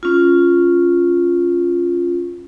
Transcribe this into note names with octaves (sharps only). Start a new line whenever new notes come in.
C#4 F4